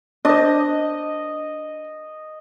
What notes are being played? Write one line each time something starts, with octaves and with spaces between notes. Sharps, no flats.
D4 C5 D#5